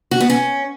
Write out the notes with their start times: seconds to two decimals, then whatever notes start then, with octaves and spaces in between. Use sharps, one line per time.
0.11 F#4
0.21 B3
0.30 C#4